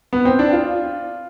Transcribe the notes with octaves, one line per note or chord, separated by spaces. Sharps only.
B3
C4
D4
F4